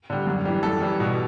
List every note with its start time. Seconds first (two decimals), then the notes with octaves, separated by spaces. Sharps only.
0.10 D3 G3
0.27 F#2
0.45 E3 G3
0.63 F#2 A4
0.81 E3 G3
1.00 B2